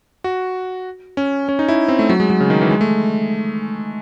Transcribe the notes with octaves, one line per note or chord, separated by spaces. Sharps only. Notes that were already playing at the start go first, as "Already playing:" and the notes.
F#4
C#4
C#4
D#4
E4
C4
A3
F#3
G#3
F#3
C#3
D#3
E3
G#3
A3